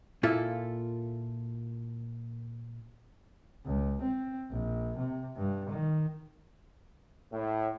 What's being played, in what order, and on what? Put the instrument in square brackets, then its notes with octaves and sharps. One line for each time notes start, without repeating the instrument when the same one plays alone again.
[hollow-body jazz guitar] A#2 A#3 E4 F4 A4
[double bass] C#2
C4
A#1
C3
G2
D#3
[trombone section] A2